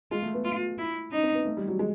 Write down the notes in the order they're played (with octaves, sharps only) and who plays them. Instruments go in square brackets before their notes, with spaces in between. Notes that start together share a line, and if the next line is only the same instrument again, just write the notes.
[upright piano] G#3 [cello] F4
[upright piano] A3
B3
[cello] F4
E4
[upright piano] C#4 [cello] D#4
[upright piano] C4
B3
A3
G3
F#3
G#3